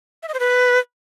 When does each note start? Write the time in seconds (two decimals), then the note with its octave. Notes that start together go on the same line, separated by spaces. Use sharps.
0.23 E5
0.28 D#5
0.34 C5
0.40 B4